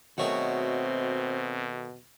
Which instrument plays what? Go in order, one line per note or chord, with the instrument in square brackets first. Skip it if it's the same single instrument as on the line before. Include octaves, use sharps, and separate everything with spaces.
[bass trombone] B2 [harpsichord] D#3 A3 G#4 [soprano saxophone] C4 [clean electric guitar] F#4 C#5